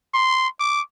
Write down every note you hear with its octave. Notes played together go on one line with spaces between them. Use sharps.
C6
D6